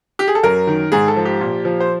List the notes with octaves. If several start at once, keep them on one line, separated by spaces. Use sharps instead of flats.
G4
G#4
A4
F#2 A#4
D#3
G#2 G#4
A4
F3
G4
A#2
F3
C5